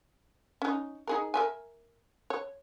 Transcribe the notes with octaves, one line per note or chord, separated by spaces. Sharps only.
C#4 D#4
D#4 G#4 A#4
A#4 E5 G#5
C#5